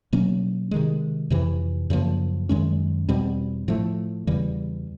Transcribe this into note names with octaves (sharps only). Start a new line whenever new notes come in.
B2 F#3 A#3 C#4
C3 D#3 G#3
F2 C3 E3
F#2 C#3 F3 A#3
F#2 D#3 G#3 C#4
E2 B2 G3 C4
A2 F3 A3
E2 C#3 E3 G3